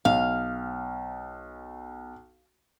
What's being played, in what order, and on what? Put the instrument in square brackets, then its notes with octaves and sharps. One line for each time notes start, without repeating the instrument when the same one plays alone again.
[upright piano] B1 [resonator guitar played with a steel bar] F5